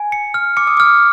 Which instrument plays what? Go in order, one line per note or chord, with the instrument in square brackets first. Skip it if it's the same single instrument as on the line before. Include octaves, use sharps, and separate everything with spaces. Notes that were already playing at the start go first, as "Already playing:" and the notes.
Already playing: [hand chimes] G#5
[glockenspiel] C#7
F6
[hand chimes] D6 [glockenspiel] C#7
[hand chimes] D#6
[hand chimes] D6 [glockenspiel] F6